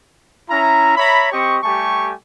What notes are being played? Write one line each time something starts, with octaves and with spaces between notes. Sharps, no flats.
C#4 E4 E5 A#5
C#5 E5 A#5 B5
C4 G4 D#5 C#6
G3 A3 G4 A4 G#5 C#6